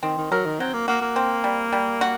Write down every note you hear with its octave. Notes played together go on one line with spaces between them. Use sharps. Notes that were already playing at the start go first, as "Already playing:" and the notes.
D#3 C4
D#3
F#3 A#4
D#3
F#3 C4
A#3
A#3 F#4
A#3
C4
G3
G3
F#4